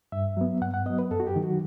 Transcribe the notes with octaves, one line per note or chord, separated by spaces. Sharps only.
G2 E5
F#3 B3
G2 F#5
F#5
F#3 B3 D#5
B4
F#2 A4
F#4
G4
D#3 F#3
F#4